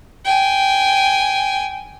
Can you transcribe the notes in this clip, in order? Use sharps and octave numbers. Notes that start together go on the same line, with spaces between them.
G5 G#5